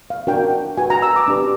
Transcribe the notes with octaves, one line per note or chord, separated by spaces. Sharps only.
F5
D4 F#4 A#4 C#5 G5
F#4 B4 G#5
A#5
E6
D6
D4 G4 B4